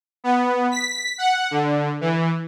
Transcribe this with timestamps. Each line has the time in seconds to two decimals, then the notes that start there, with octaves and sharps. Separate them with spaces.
0.24 B3
0.71 B6
1.18 F#5
1.51 D3
2.01 E3